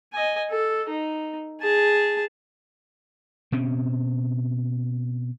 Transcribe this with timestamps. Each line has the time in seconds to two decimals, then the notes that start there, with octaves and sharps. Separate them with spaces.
0.13 D#5 G#5
0.51 A4
0.89 D#4
1.62 G#4 A5
3.52 B2 C4 C#4